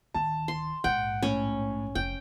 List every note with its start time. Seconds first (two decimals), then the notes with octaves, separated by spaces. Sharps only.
0.15 D1 D#3 A5
0.48 C6
0.84 A#1 G#2 F#5 G5
1.23 A2 C#4
1.95 F1 F2 G5